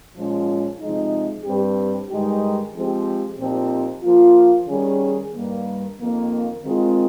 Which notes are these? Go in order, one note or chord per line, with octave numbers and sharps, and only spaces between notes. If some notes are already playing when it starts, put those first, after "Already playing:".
A#2 F3 G#3 C#4 F4
C3 F3 G#3 D#4
G2 G3 C4 G4
G2 D#3 G#3 D#4 G4
F3 G#3 C4 G4
A#2 F3 C4 D#4 G4
F3 A#3 F4
D#3 G3 C#4 G#4
G2 D#3 G3 A#3
F2 D#3 A#3
D#3 G#3 C4 F4